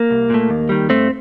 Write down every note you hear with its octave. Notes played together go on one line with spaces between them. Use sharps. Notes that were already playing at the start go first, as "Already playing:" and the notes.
Already playing: A#3
C2
A#2 A3
D#2
D#3 G3
G2 A3 C4